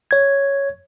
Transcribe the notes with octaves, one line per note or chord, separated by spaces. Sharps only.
C#5 G#6